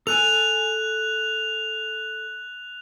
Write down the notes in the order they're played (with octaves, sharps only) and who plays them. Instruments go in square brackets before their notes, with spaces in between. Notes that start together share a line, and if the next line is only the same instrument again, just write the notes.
[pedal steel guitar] A4 G#5 [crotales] F#6 F7